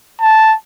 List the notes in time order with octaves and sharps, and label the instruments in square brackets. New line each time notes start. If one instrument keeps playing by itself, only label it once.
[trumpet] A5